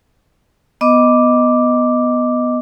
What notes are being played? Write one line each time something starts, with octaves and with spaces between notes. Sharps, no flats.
B3 D#5 D6